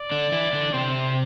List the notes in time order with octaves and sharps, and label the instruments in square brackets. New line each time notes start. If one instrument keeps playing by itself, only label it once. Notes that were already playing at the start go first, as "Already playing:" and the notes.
Already playing: [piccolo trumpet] D5
[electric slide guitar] D3 D4
E3 E4
D3 D4
[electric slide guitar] C3 C4 [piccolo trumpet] C5